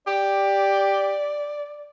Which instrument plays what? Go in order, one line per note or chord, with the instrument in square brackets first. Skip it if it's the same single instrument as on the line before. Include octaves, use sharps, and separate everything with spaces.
[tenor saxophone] G4 [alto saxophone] D5